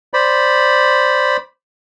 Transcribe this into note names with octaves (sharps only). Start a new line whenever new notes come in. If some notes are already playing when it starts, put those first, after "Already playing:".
C5 D5 B5